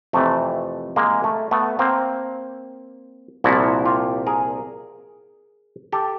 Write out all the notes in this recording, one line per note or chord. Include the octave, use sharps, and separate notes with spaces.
F2 C3 E3 A3
G#3 A#3
A3
A3 B3
A#3 C4
C2 A#2 F3 E4 F#4
F4 G4
G#4 A#4
G4 A4